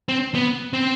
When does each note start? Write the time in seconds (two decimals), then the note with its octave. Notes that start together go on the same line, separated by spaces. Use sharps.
0.09 C4
0.35 B3
0.73 C4